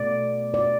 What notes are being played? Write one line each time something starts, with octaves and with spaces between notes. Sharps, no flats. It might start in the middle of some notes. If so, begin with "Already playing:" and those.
Already playing: B2 A3 D5
D5